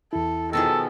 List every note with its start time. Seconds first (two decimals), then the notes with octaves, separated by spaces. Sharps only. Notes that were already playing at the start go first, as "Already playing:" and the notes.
0.13 E2 E4 A4
0.53 B2 D#3 F3 G#4 A4